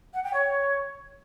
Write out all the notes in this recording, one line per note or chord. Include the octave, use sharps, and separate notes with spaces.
F#5
G5
C#5